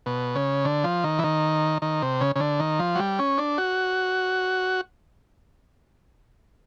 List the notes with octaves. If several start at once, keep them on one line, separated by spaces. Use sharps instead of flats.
B2
C#3
D3
F3
D#3
E3
D#3
D#3
C3
C#3
C#3
D3
D#3
F3
F#3
G3
C#4
D4
F#4